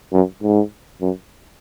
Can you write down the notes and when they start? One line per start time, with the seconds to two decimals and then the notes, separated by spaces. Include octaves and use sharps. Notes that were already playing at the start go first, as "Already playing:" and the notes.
0.13 F#2
0.43 G#2
1.01 F#2